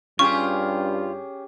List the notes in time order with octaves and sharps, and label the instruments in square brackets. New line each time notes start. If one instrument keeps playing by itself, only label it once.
[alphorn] G2 [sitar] C#4 G4 G#4 [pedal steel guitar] F4 [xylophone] C#6